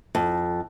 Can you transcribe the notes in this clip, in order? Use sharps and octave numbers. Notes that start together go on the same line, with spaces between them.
F2